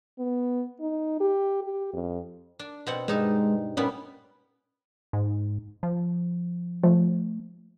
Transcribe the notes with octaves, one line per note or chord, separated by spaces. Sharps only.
B3
D#4
G4
G4
F2
D4
B2 C4 F#5
G2 G#3 D#4 A5
A#2 G3 B3 C#4
G#2
F3
F3 A3